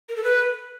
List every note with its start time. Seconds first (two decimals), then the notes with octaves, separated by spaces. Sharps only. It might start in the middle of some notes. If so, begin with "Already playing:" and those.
0.09 A#4
0.16 A4
0.24 B4